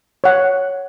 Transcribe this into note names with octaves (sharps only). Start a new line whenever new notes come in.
C#5 F#5